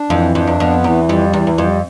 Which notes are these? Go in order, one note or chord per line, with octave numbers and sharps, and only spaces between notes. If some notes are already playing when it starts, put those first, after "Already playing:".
Already playing: D4
F2 E3
F2 D4
E2
F2 B3
E2 E3
F2 G3
E2 E3
E2
F2 G3